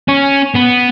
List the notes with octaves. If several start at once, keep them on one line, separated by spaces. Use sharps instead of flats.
C#4
B3